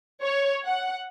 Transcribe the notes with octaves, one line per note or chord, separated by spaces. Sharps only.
C#5
F#5